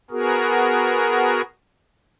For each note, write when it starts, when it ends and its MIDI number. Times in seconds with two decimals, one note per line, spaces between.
0.11 1.41 59
0.11 1.41 66
0.11 1.41 68
0.11 1.41 70